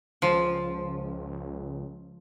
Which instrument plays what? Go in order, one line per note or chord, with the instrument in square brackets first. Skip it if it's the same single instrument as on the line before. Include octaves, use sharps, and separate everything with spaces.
[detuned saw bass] C#2 [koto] F3